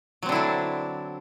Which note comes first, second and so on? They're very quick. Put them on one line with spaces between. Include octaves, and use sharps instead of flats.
F#3 C4 D3 E4 D4